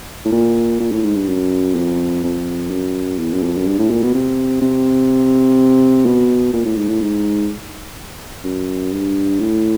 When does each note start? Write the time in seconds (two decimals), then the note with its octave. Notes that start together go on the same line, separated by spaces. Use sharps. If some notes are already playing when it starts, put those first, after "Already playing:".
0.25 A2
0.32 A#2
0.80 A#2
0.92 A2
1.03 G#2
1.15 G2
1.28 F#2
1.75 F2
2.24 F2
2.70 F#2
3.19 E2
3.33 F#2
3.43 F2
3.58 F#2
3.67 G2
3.78 A2
3.90 A#2
4.03 B2
4.14 C3
4.61 C3
6.06 B2
6.53 A#2
6.65 A2
6.76 G#2
6.88 A2
7.01 G#2
8.44 F#2
8.92 G2
9.40 A2